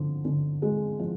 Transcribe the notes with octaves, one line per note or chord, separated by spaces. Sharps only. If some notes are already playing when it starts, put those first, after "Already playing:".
Already playing: D3 F3
D3
G#3
F3